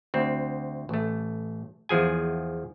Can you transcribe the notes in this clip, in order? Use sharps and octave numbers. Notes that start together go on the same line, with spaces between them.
D2 C4
A1 A3
E2 F3 G#4 G#5